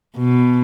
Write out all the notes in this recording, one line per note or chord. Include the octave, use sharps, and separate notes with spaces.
B2